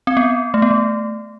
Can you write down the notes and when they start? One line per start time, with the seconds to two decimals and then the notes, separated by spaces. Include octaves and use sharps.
0.07 C4
0.17 B3
0.54 A3
0.62 B3
0.71 A3